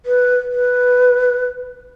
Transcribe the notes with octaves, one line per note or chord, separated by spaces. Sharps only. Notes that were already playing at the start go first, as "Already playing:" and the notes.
B4
B4